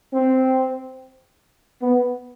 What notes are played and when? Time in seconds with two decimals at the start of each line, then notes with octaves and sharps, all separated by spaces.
0.14 C4
1.82 B3